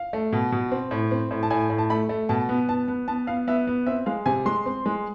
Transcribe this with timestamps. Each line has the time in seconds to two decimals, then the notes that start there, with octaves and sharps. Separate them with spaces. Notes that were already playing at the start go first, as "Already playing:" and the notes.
Already playing: F5
0.13 A3
0.33 B2
0.52 B2
0.72 C4
0.91 A2
1.11 C4
1.31 A2
1.43 A5
1.50 A2 G#5
1.70 A2
1.78 A5
1.90 A3 B5
2.09 A3
2.29 B2 A5
2.49 B3
2.68 B3 A5
2.88 B3
3.08 B3 A5
3.27 B3 F5
3.47 B3 E5
3.67 B3
3.87 C4 E5
4.06 G#3 F5
4.26 C3 G#5
4.46 G#3 C6
4.66 C4
4.86 G#3